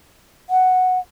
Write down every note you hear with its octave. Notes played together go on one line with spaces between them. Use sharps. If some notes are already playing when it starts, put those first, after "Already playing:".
F#5